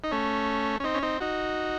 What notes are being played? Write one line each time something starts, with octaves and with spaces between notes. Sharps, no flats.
D#4
A3 C#4
C#4
C4 D#4
C#4
C4 D#4
D#4 F#4